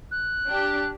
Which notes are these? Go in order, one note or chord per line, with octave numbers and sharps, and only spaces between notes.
F#6
D4 G4